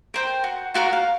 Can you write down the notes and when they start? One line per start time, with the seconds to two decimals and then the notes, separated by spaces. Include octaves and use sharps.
0.14 A#4 C5 G5
0.44 F#4
0.74 F4 F#4 A#4 A#5
0.93 F5